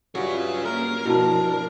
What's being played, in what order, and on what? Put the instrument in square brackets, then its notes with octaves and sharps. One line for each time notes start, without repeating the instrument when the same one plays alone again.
[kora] G2 F#3 [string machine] F4 B4 E5 [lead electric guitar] G#4 C#5
[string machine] A#3 C#4 F5 [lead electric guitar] A#4 [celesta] F6
[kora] B2 [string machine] F3 D4 [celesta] E4 F#4 A5